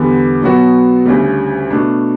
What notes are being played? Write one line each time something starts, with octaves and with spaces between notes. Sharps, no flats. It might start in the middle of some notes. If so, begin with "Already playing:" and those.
Already playing: E2 D3 G3 B3
B2 F#3 B3 F#4
D2 C#3 G3
B2 A3 D4